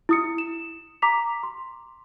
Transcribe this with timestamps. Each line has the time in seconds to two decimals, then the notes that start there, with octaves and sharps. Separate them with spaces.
0.09 E4 D#6 C#7
0.38 E7
1.02 A#5 D6 B6 F7
1.43 C6